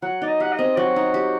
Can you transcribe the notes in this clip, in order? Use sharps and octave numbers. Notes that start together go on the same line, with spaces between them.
F#3 F#5
D#4 D5
D#5
G4 F#5
D#5
C4
F#3 F#4
D#4
G4